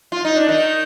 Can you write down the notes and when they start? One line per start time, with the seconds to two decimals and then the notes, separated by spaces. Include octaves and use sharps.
0.12 F4
0.25 D#4
0.36 D4
0.49 D#3 D#4